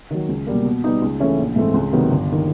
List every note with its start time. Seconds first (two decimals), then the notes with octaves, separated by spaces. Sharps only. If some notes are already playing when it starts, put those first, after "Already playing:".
0.11 D#3 F#3
0.29 C#2
0.47 B2 G3 A#3
0.65 B2
0.84 G3 B3 D#4
1.02 C#2
1.20 C#3 E3 A3 C#4
1.38 A#1
1.56 G#2 E3 A3 C4
1.74 C#2
1.92 C3 D#3 F#3 B3
2.11 G1
2.32 D#3